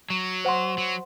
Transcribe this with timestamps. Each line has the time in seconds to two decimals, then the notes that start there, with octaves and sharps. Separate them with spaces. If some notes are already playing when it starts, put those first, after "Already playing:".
0.10 F#3
0.45 C5 F#5 C6
0.78 F#3